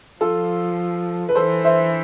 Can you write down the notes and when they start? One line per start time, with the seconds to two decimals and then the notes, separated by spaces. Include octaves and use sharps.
0.21 F3 F4 A4
1.29 B4
1.35 E3 A4 C5
1.65 C5 E5